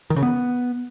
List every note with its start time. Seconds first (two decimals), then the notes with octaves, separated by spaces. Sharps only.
0.10 D#3
0.16 C#3
0.23 B3